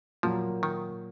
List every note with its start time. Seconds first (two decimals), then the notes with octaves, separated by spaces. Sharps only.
0.23 A#2 F3 F#3 A#3
0.63 D#3